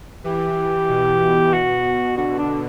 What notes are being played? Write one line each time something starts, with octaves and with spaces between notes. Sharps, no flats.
E3 G4
B2
F#4
D3 F#4
D4